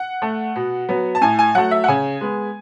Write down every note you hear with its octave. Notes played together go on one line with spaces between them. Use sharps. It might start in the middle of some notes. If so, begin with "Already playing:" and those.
Already playing: F#5
A3
B2
F#3 B3
A5
A2 G#5
G#5
F#3 A3 F#5
E5
F#5
C#3 G#5
G#3 B3